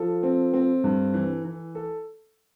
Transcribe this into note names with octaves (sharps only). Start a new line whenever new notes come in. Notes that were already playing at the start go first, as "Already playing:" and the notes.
Already playing: F3 A4
C4
C4
G2
E3
E3
A4